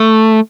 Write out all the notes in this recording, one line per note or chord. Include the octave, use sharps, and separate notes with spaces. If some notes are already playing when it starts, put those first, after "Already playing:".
Already playing: A3